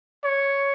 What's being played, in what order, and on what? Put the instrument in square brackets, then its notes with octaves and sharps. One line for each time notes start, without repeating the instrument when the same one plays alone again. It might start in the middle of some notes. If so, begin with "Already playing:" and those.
[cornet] C#5